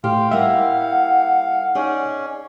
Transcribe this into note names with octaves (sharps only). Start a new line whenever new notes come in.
A2 G4 F5 C6
G3 A#3 E4 E5 F#5
C#4 D#4 G#4 D5